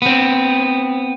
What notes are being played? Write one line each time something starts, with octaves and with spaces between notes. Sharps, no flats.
B3 C4